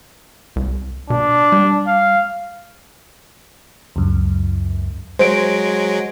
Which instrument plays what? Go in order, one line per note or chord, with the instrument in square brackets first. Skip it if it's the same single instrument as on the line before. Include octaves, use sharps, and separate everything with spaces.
[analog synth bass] C2
[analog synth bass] B2 [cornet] D4
[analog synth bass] G3
[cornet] F5
[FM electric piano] C#2 F#2
[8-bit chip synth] F#3 G#3 [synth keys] C5 D7